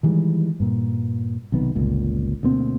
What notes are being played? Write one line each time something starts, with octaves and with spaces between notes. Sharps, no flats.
D#3 E3 G3 G#3
G2 A#2
B1 C3 D#3 B3
G1 C#2 A#2
D2 B2 A#3 C4